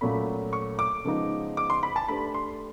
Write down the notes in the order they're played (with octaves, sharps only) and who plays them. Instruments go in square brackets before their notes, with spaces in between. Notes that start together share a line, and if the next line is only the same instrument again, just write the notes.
[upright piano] A#2 F#3 A3 C#4 [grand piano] B5
[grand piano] C#6
D6
[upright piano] C#3 F3 G#3 B3 D#4
[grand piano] D6
C6
B5
A5
[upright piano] A3 D4 G4 B4 [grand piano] B5
[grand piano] C6